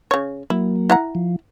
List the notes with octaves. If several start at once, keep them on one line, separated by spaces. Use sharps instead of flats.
C#3 C#5
F#3 A#3 E4
E4 F#5 A#5
F3